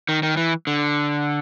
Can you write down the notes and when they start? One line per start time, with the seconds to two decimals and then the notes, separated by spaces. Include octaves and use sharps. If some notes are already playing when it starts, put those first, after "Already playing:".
0.09 D#3
0.23 D#3
0.37 E3
0.67 D3